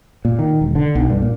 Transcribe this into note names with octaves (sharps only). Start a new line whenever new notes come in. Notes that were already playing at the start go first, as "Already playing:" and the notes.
A#2
D#3
E1
D3
B1
G2
A#2